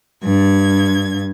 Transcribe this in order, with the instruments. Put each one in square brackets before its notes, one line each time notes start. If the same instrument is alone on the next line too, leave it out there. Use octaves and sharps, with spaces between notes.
[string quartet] G2 G#6